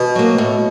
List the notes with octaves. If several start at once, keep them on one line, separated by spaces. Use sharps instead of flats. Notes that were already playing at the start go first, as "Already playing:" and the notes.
Already playing: B2
F#3 A#3
A2